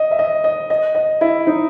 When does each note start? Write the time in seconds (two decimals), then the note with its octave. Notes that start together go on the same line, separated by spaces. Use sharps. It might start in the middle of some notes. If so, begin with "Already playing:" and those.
Already playing: D#5
0.11 E5
0.19 D#5
0.44 D#5
0.70 D#5
0.95 D#5
1.21 E4
1.47 D#4